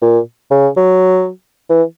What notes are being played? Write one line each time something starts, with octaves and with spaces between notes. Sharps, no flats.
A#2
C#3
F#3
E3